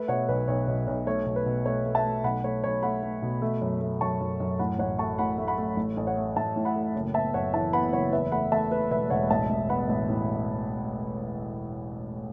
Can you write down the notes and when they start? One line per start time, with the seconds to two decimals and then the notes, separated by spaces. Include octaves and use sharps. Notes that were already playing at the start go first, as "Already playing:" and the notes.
Already playing: A3 B4 E5
0.08 B2 C#5 F#5
0.29 B1 B4
0.48 B1 C#5
0.67 B1
0.87 B1 C#5
1.06 A3 C#5
1.26 B1
1.36 B4
1.46 B2
1.66 A3 C#5
1.86 A3
1.95 E5 A5
2.05 A3
2.24 B1 F#5 B5
2.44 A3 C#5
2.64 B1 C#5
2.83 A3 F#5 B5
3.03 A3
3.22 B2
3.42 A3
3.61 F#2
3.81 A3
4.01 F#2 A5 C#6
4.21 F#2
4.40 F#2
4.59 A2 F#5 B5
4.79 A1 C#5 F#5
4.99 A3 A5 C#6
5.18 A2 F#5 B5
5.38 A3
5.47 F#5 B5
5.58 A3
5.77 A1
5.97 A1
6.07 C#5 F#5
6.17 A3
6.36 A1 E5 A5
6.56 A2
6.65 F#5 B5
6.75 A3
6.96 F#1
7.14 B3 E5 A5
7.34 F#2 C#5 F#5
7.53 E3 E5 A5
7.73 B3 F#5 B5
7.93 F#1 C#5 F#5
8.12 E2 B4 E5
8.32 A3 F#5 B5
8.52 A3 E5 A5
8.71 A3 B4
8.91 E1 B4 E5
9.10 E1 C#5 F#5
9.30 A1 E5 A5
9.49 A1
9.69 B3 F#5 B5
9.89 A1
10.09 A2